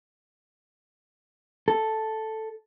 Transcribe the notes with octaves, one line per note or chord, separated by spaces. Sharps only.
A4